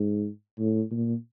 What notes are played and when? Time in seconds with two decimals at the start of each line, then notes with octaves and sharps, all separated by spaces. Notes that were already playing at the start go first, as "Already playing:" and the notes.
Already playing: G#2
0.59 A2
0.91 A#2